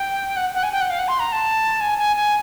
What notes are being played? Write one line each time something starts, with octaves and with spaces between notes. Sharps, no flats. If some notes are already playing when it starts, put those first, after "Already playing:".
Already playing: G5
F#5
F#5
G#5
G5
F#5
F5
F#5
C6
A#5
A5
G#5
G#5
G#5